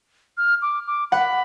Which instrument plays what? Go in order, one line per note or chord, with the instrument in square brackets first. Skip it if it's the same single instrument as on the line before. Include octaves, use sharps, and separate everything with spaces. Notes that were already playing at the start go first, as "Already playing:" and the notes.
[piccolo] F6
D6
D6
[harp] F#5 [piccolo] B5